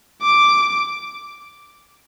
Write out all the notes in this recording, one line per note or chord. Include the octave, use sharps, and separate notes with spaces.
D6